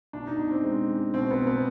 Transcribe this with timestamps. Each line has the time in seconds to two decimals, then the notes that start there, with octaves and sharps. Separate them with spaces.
0.13 B2 D4
0.27 D#4
0.38 B2 D4
0.51 C4
0.64 G#3
0.89 G#3
1.14 B2 C4
1.30 B3
1.38 B2
1.47 B3